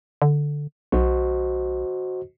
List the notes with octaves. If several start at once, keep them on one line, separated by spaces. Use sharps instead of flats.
D3
B1 F#4 C5 D#5